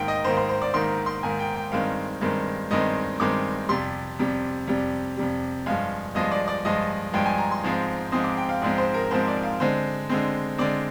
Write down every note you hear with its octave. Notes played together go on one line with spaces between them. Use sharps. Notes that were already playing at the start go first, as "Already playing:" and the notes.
Already playing: G#2 D#3 A#3 G5
D#5
G#2 D#3 A#3 C5
C5
C5
D5
G#2 D#3 A#3 C6
C6
G#2 D#3 A#3 G#5
G5
G5
G2 D#3 G#3 C4 F5
G2 D#3 G#3 C4
G2 D#3 G#3 C4 D#5
G2 D#3 G#3 C4 D6
F2 C3 G3 C6
F2 C3 G3
F2 C3 G3
F2 C3 G3
G2 F3 G#3 F5
G2 F3 G#3 D#5
D5
D5
G2 F3 G#3 D#5
G2 F3 G#3 G5
G#5
A#5
C6
G#2 F3 G#3 C4
G#2 F3 G#3 C4 D#6
D6
G5
F5
G#2 F3 G#3 C4 D5
C5
A#4
G#2 F3 G#3 C4 C5
D5
F5
D3 G#3 C4 C5
D3 G#3 C4
D3 G#3 C4 D5